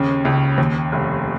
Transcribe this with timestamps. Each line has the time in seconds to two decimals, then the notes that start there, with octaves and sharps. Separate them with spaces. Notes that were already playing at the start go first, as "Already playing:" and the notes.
Already playing: D#2 C#3
0.25 C#2
0.58 D#2
0.92 F1